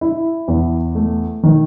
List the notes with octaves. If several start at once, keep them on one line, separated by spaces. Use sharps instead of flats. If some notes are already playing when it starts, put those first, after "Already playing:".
E4
E2
A3
D#3